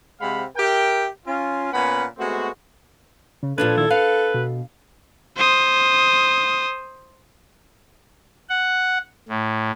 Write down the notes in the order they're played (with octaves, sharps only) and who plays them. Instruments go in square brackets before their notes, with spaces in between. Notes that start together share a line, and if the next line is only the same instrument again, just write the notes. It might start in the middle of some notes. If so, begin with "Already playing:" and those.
[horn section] C3 G#3 C4 F5 F#5 B5
G4 A#4 E5 G5
C#4 F4
A#2 B3 C#4 B4 F#5 B5
G#3 A3 B3 C4 F#4
[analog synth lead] C#3
[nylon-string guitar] A#2 F3 D4 [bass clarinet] A4 [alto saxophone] B4 [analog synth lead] G#6
[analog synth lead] D#3 [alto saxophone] E4
[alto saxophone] B4 [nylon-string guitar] F5 [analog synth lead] C#7
[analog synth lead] B2
[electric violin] C5 D#6
[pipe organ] F#5
A2